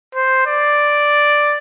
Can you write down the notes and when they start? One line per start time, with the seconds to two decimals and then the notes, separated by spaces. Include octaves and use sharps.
0.15 C5
0.47 D5